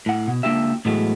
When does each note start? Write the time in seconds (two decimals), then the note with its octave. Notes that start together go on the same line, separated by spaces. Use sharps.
0.06 A2 F#5
0.27 B2
0.43 C#2 A#3 D4 F4 G4 E5
0.85 A2 E3 F#3 G#3 A3 B3